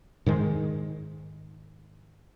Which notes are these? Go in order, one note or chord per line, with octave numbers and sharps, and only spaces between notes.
G#2 D#3 G#3